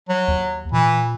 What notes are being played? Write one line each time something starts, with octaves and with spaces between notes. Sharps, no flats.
F#3
D#2
A#2 E3